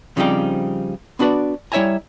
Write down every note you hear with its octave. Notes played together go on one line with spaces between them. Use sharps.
C#3 F3 G3 C4 D#4 G4
B3 D4 F#4 B4 D5
G3 E4 C#5 E5 G#5 A#5